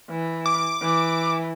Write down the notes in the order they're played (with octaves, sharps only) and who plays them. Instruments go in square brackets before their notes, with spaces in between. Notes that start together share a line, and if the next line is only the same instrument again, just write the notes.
[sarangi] E3
[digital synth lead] D6
[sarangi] E3